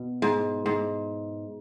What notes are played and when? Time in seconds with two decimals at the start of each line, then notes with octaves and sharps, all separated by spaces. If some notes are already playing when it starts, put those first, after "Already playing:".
Already playing: B2
0.22 G#2
0.66 G#2